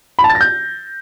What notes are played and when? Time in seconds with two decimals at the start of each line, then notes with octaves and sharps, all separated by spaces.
0.19 B5
0.24 A5
0.30 A6
0.35 A#6
0.41 G6